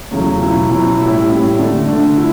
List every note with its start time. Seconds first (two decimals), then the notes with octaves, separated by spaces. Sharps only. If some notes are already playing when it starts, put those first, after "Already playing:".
0.11 E2 C#3 F#3 A3 C#4
0.40 B2 F#3 C#4 E4
0.70 B2 F#3 C#4 E4
0.99 A2 G3 C#4 E4
1.29 A2 G3 C#4 E4
1.59 D3 A3 D4
1.88 D3 A3 D4
2.17 E4